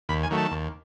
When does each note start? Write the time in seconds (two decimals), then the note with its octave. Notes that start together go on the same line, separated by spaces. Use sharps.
0.09 D#2 B5
0.23 G#5
0.30 D#3 F#3 A3
0.37 A5
0.51 D#2